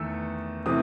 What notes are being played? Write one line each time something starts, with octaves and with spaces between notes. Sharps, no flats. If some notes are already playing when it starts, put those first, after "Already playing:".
Already playing: E2 D#3 A3 E6
C3 E3 A3 D#6